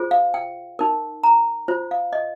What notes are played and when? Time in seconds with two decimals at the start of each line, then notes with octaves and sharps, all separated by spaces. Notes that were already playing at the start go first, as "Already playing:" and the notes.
Already playing: F4 G#4 C5
0.11 F5
0.34 G5
0.79 D#4 A#4
1.23 A#5
1.68 F4 C5
1.91 F5
2.13 D#5